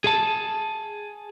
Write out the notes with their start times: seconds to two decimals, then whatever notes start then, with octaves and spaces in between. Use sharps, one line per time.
0.04 G#4 A5